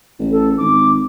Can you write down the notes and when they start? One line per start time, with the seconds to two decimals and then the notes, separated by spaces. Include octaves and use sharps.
0.19 A1
0.31 A4
0.58 G#1 D6